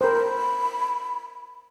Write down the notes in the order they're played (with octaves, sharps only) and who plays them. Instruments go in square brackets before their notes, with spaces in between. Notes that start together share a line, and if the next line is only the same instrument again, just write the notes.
[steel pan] A#4 C5 [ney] B5